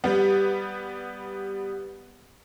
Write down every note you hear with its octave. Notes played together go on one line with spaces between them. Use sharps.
G3 B3